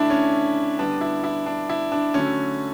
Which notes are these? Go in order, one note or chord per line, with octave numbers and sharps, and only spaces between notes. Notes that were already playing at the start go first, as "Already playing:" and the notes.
Already playing: D3 A3 D4 E4
C#4
D3 G3 B3 D4
E4
E4
D4
E4
D4
D3 F#3 A3 C#4